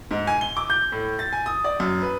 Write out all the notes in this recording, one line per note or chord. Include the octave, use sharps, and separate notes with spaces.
G#2
G#5
G7
D6
G6
A2
A6
G#5
D#6
D5
F#2
B4